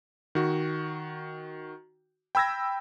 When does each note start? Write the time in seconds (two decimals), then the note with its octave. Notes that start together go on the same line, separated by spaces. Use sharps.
0.35 D#3 F#4
2.35 G5 B5 E6 G#6 A#6